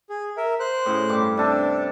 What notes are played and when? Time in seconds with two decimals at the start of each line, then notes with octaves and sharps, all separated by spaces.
0.10 G#4
0.37 A#4 E5
0.60 C5 F#6
0.86 A2 C#3
1.09 G2 G3 D6
1.37 C3 D4 A4